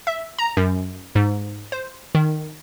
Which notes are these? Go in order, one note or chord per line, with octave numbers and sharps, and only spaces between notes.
E5
A#5
F#2
G#2
C5
D#3